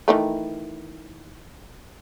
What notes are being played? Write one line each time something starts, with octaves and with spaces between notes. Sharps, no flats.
D#3 E3 A3